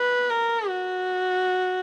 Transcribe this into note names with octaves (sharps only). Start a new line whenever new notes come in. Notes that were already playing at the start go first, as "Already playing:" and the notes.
Already playing: B4
A#4
F#4